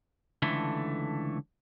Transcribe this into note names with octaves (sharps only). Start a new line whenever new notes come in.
C#2 D3 E3 A3